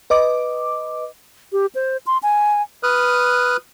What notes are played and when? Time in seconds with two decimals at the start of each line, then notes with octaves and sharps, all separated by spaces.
0.10 B4 D#5 D6
1.52 G4
1.75 C5
2.07 C6
2.23 G#5
2.83 B4 D#6 F6 F#6